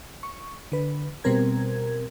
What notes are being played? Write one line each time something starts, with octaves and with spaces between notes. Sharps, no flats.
C#6
D3 B4
B2 G3 C4 A#4 G#6